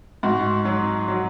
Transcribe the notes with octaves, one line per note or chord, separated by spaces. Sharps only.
G#2 F#4
F#3
F#3